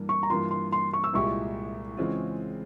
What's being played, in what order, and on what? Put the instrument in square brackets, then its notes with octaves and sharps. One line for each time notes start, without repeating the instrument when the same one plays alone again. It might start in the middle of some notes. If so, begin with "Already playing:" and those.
Already playing: [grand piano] G2 E3 G3 A#3
[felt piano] C#6
A#5
[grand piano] G2 E3 A#3 F4 [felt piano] C6
[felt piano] C6
C6
C#6
E6
[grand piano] C2 A#2 G#3 E4 G4 [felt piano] C#6
[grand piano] C#3 E3 G#3 C4 F4